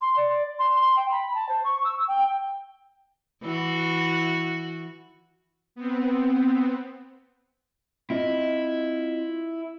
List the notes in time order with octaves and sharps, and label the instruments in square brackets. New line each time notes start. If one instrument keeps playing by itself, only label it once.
[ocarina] C6
D5
C6
C6
G5
B5
A5
C5
C#6
E6
G5
[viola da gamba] E3 F#4
[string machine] B3 C4
[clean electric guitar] C4 F4 D#5 [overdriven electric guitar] E4